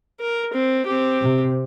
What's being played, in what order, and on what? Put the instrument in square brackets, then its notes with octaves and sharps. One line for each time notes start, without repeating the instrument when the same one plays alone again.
[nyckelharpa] A#4
C4
C4 G4
[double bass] C3